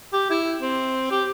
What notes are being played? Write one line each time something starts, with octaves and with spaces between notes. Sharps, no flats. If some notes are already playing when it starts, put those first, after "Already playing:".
G4
E4
C4
G4